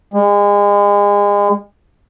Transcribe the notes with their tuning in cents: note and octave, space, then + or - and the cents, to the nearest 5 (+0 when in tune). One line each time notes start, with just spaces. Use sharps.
G#3 -35